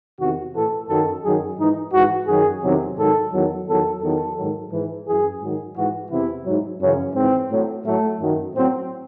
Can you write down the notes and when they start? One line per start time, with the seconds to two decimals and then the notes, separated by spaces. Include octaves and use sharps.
0.18 E2 C3 D#3 F#4
0.54 A2 E3 A4
0.88 F#2 D#3 F#3 A4
1.23 F#2 D#3 F#3 G#4
1.59 G#2 E3 D#4
1.92 G#2 E3 F#4
2.27 F#2 D#3 F#3 G#4
2.62 E2 C3 D#3 F#3
2.97 G#2 D#3 F#3 A4
3.32 E2 D#3 F#3
3.67 E2 D#3 F#3 A4
4.01 E2 D#3 F#3 A4
4.36 G#2 D#3 F#3
4.72 G#2 E3
5.06 F#2 E3 G#4
5.41 G#2 D#3 F#3
5.75 G#2 E3 F#4
6.10 E2 C3 E3 E4
6.45 G#2 F#3
6.80 F#2 C#3 E3 C#4
7.15 G#2 E3 C4
7.51 A2 F#3
7.85 A2 F#3 A3
8.20 F#2 D#3 F#3
8.54 A2 F#3 C4